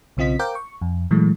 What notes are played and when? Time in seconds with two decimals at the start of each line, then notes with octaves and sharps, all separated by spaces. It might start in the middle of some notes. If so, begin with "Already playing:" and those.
0.17 B1 C#3 C4 F4 D#5 B6
0.39 A#4 C5 F5 G5 D6 G6
0.55 C#6
0.81 F2
1.11 A#2 E3 F#3 G#3 A3